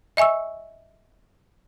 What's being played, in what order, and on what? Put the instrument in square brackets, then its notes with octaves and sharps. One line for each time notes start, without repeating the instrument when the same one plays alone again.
[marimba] D#5 E5 G#5 C#6 E6